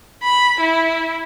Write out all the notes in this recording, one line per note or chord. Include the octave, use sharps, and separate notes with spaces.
B5
E4